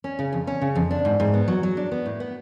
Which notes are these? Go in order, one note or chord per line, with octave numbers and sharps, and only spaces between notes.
C#4
C#3
F2
C#4
C#3
F2
D4
G#2
G#2
B3
F#3
F#3
D4
B3
A2
B3